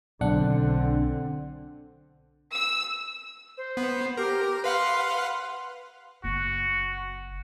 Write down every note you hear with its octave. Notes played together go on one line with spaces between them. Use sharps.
B1 D3 C4 D4 F#5
E6
C5
B3
G4 A#4
B4 F5 F#5 C6
F#1 F#4